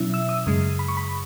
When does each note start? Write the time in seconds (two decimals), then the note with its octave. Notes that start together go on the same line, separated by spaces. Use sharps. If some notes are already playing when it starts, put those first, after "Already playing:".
Already playing: B2 F#3 C#4 E4 E5
0.14 E6
0.29 D#6
0.46 F#2 C#3 G#3
0.79 B5
0.88 C#6
0.97 B5